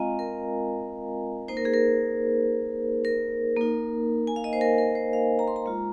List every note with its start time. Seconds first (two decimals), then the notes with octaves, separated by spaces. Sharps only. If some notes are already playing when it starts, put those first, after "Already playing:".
Already playing: G#3 C4 F4 D#5 F5 G#5 A#5
0.19 A#4
1.48 A#3 D#4 C5
1.57 A#4
1.65 G#4
1.74 A#4
3.05 A#4
3.57 A#3 D#4
4.27 G#5
4.36 F5
4.44 D#5
4.53 C5
4.61 A#4
4.78 A#4
4.95 C5
5.13 F5
5.39 A#5
5.48 C6
5.56 A#5
5.66 G#3 F4